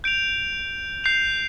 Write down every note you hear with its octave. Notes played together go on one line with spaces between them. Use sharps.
G6 D7 F7
G6 C7 F7